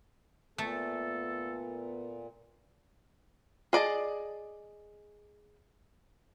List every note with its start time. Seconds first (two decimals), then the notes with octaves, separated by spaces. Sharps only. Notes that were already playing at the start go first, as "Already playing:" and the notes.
0.58 A#2 A3 B3 A4
3.73 G#4 D5 D#5 A5